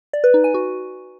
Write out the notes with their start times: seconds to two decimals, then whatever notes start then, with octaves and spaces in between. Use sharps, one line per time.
0.13 D5
0.24 B4
0.34 D#4
0.44 G#5
0.54 F#4